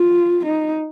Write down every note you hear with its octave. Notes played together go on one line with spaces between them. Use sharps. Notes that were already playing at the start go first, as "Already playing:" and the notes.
Already playing: F4
D#4